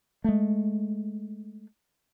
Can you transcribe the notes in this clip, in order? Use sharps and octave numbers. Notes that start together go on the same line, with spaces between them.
G#3 A3